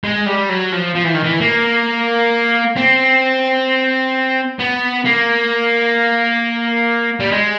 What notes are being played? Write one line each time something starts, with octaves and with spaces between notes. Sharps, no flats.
G#3
G3
F#3
F3
F3
E3
D#3
E3
A#3
C4
B3
A#3
G3
G#3